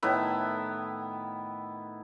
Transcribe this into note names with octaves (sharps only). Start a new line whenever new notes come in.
A2 D#3 B3 E4